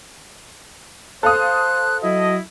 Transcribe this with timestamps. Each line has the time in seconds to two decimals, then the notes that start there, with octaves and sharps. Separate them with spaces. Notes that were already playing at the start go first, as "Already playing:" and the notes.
1.23 A4 C5 F5 D#6 F#6
2.03 F#3 E4 F#4 D#5